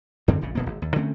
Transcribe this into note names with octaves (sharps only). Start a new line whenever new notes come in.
F#2 D3 D#3 C4
F1 A#1 A#2 C#3
D#1 B2 A#3
G#1
D#2
D3 A3 C4 C#4